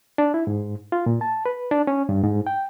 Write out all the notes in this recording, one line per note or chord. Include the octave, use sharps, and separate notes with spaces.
D4
E4
G#2
F4
A#2
A5
B4
D4
C#4
G2
G#2
G5